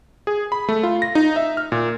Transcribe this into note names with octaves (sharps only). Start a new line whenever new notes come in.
G#4
B5
A3
F4
A#6
D#4
E5
F6
A#2